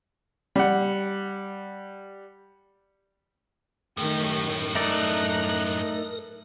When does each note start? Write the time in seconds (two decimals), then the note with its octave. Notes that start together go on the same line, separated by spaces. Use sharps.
0.56 G3 F#5
3.97 F#2 A2 D#3 A3 G4 A#4
4.75 A3 D#4 D5 A#5 F#6